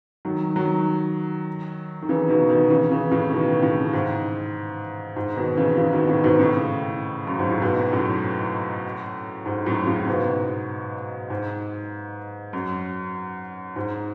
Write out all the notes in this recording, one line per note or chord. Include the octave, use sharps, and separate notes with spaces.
D#3 F#3
D#3 F#3
D#3
C#3 E3
B2 D#3
B2 D#3
C#3 E3
C#3 E3
A2 C#3
B2 D#3
A2 C#3
G#2
G#2
B2 D#3
C#3 E3
C#3 E3
B2 D#3
A2 C#3
G#2 B2
A2 C#3
F#2
G#2
A2
G#2 B2
F#2 A2
G#2
F#2 A2
A2 C#3
G#2 B2
G#2
F#2
G#2